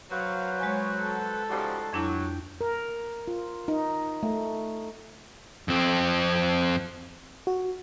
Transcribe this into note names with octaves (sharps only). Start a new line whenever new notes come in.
F#3 B4 C5 F5 F#5
G#3 C#5 G#5
A4
C#3 F3 G3 D#4 F#4 C6
F2 F#3 D4 E4 G5
A#4
F4
D#4
A3
F2 C4
F#4